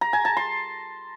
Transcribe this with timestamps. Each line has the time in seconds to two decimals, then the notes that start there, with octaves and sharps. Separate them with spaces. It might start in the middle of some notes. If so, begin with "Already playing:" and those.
0.01 A#5
0.13 G#5
0.25 A5
0.37 C6